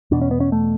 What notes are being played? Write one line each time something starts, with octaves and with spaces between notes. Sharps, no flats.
E2 B2 D4
C#4
B3
C#4
A3